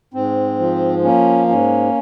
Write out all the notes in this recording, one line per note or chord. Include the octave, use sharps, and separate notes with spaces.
G#2 C4
F3
A#3 C#4
G#2 C#4